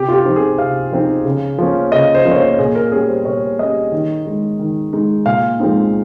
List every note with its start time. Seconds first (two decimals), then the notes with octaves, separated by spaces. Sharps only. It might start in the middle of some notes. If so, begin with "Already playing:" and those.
Already playing: C3 G4
0.08 F4
0.14 G4
0.25 F3 C4 D#4
0.36 G#4
0.58 C3 F5
0.92 F3 C4 D#4
1.25 C#3
1.58 F3 A#3 C#4
1.92 C#3 D#5
2.15 C5
2.25 F3 A#3 C#4
2.32 C#5
2.36 C5
2.59 A#2 G#4
2.75 A#4
2.92 G3 C#4 G#4
3.09 C5
3.25 A#2 C#5
3.59 G3 C#4 D#5
3.92 D#3
4.26 G#3 D#4
4.59 D#3
4.93 G#3 D#4
5.26 A#2 F5
5.59 F3 G#3 C4 D#4